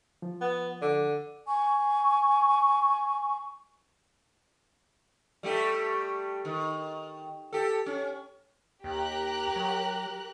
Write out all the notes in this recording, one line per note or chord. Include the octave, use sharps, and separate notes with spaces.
F3
B3
D3
G#5 C#6
G3 A3 G4
D#3
G4 A4
C#4
D#2 G4 A#4 F#6
F#3